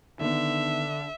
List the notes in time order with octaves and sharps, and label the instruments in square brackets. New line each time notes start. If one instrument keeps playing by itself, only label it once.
[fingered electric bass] D3 [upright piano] D#3 B3 [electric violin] E5